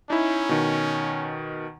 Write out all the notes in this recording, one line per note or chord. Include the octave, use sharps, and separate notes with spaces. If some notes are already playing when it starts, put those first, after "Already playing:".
C#4 D#4 E4
B2 D#3